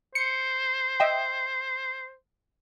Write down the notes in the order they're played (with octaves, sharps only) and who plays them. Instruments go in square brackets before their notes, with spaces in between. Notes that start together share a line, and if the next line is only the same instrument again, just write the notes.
[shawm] C5 [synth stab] C#7
[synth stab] D#5 E5 G5